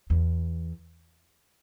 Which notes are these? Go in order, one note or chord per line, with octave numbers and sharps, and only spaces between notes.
E2